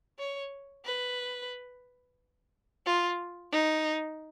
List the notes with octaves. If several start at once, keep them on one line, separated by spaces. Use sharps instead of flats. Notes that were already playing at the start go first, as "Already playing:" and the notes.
C#5
B4
F4
D#4